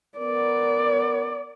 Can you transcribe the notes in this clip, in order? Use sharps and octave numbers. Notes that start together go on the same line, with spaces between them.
B3 A#4 D5